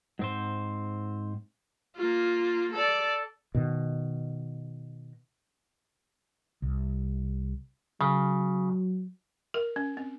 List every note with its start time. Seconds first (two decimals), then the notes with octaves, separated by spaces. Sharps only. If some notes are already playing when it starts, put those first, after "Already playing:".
0.19 G#2 C4 C5
1.96 A#3 F4
2.73 A4 D5
3.55 B2 D#3
6.62 C2
8.01 C#3 F#3
9.54 A#4
9.76 C#4
9.97 C4